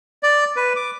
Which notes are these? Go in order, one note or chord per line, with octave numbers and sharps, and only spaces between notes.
D5
B4
D6